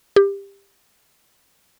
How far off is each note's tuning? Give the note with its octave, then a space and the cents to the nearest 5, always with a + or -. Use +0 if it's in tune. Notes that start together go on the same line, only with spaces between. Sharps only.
G4 +20